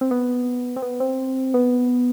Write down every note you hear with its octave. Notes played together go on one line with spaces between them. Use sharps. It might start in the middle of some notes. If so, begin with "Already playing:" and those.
C4
B3
C4
B3
C4
B3